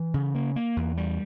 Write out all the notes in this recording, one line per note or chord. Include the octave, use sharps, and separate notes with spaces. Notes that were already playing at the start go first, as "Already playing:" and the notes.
Already playing: E3
C#3
A#3
A#3
E2
G3